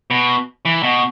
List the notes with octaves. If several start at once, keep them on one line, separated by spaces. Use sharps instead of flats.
B2
E3
B2